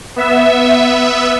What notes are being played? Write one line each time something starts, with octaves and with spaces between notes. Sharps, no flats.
B3 E5